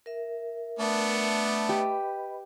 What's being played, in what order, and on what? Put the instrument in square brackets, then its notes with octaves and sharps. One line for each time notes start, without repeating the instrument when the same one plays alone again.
[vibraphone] A#4 E5
[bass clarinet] A3 [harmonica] B3 D4
[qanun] G4 [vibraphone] B4 D#5 B5